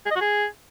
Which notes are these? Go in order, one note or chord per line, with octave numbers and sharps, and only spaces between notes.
G#4
D#5
F#4
G#4